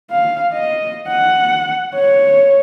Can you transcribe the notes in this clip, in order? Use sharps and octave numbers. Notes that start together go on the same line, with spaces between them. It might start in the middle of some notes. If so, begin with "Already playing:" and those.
F5
D#5
F#5
C#5